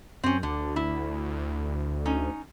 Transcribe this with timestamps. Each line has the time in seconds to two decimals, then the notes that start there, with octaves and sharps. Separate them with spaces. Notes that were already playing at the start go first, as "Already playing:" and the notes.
0.24 F#2 C4 C#4
0.43 D2 D3
0.76 E4
2.06 C#4 D#4